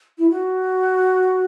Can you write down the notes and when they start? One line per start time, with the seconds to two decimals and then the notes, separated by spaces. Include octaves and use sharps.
0.18 E4
0.30 F#4